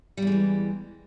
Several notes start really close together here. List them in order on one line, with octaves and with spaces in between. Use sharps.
G3 E2 G#3 E3